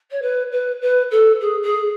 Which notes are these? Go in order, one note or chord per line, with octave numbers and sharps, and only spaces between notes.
C#5
B4
B4
B4
A4
G#4
G#4